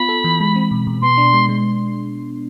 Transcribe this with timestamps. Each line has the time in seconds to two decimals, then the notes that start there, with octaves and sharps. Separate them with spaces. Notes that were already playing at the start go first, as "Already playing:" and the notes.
Already playing: B3 F4 B5
0.09 A4
0.24 E3
0.40 G#3
0.56 C4
0.71 B2
0.87 B2
1.02 B3 C6
1.18 D4
1.33 G#3
1.49 G#3